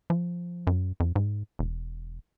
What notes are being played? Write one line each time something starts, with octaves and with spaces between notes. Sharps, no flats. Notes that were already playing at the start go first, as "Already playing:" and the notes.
F3
F#2
F2
G#2
E1